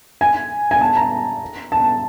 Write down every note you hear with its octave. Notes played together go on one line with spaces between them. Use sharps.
G#5
G#5
A5
A#5
A5